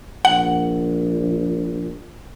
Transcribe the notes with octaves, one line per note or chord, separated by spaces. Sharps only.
A#1 F#5